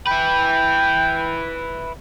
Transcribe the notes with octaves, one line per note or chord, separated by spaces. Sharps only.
E4 B4 G5